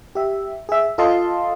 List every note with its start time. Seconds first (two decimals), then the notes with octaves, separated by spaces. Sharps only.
0.15 G4 E5
0.69 G#4 E5
0.98 F4 A4 D#5 F5 A5 C6